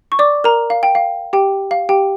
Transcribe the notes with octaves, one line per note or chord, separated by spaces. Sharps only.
C#6
D5 D6
A#4 A#5
F5
G5
F5
G4 G5
F5
G4 G5